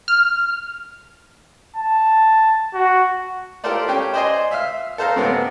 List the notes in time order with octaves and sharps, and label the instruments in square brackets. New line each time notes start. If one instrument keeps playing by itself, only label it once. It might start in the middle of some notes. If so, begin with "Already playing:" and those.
[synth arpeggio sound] F6
[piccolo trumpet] A5
F#4
[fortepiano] F4 G4 A4 A#4 C5 D5
C#4 G4 G5
C5 D5 D#5 G#5 C6
E5 F5 F6
A4 C5 F5 A#5
F#2 C3 B3 C4